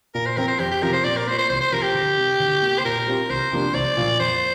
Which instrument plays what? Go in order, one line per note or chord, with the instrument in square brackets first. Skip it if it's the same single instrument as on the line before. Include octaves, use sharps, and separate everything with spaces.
[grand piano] A#2 [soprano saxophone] A#4
[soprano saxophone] C5
[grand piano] F3 C4 [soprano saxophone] A#4
[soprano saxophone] C5
[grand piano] F2 [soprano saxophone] G4
[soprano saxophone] G4
[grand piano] C3 F3 C4 [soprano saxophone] A#4
[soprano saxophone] C5
[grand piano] A#2 [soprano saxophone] D5
[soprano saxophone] A#4
[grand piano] A#3 [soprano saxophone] C5
[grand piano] F4
[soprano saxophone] C5
[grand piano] C2 [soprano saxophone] C5
[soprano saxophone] C5
[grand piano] C3 F3 [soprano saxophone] A#4
[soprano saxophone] G4
[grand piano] D2
C3 G3
D2
C3 A#3
[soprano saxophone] C5
[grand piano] A#2 [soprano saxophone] A#4
[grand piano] G3 C4 F4
[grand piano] C2 [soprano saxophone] C5
[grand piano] C3 F3 A#3 D4
[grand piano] C2 [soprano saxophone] D5
[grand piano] A#2 F3
[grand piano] F2 [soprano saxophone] C5